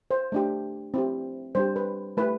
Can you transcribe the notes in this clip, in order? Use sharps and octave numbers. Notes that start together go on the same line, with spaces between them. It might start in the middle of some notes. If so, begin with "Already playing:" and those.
C5
A3 D4 G4
C4 E4 G4
G3 D4 G4 C5
B4
A3 E4 G4 B4